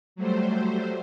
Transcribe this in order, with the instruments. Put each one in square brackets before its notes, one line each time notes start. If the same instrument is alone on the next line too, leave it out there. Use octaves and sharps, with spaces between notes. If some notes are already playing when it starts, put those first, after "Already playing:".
[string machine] F#3 G3 A3 C5